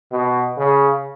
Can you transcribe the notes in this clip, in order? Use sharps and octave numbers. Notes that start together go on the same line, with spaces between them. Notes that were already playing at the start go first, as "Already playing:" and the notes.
B2
C#3